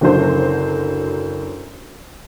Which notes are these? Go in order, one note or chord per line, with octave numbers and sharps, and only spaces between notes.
F#1 D3 F#3 A4 C5